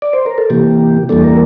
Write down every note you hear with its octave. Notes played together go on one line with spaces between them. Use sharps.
D5
C5
A#4
A4
C3 E3 A#3 G4
E2 E3 G3 A#3 D4 A4
A#4